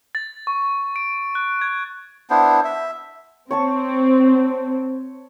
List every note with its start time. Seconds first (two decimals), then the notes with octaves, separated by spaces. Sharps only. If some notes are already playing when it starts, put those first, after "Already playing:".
0.15 A6
0.47 C#6
0.96 D7
1.35 F#6
1.62 G#6
2.30 B3 D4 E4 C5
2.64 E5
3.51 C4 C#5 A5 C#6